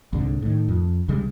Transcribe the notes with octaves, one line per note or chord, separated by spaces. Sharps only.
C2 G#2 D3
A2 D#3
F2
B1 C#3 G3 G#3